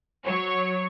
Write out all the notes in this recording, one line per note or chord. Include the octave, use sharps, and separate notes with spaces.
F#3 C#5 C#6